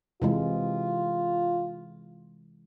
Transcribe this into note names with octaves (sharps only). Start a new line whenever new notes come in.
C3 E3 G#3 F4